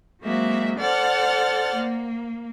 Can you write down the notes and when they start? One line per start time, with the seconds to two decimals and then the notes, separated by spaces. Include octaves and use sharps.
0.22 F#3 G#3 A#3 C4 F#4 E5
0.79 A4 C5 D5 F#5 F6 A6
1.76 A#3